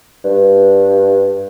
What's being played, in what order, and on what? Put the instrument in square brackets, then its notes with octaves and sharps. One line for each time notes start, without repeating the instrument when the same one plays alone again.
[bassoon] G2